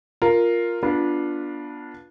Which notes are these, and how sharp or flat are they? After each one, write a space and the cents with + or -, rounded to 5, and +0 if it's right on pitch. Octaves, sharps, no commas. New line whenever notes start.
F4 +0 A#4 +0
B3 -25 D4 +0 F4 +0